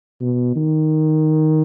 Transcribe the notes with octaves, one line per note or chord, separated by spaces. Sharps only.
B2
D#3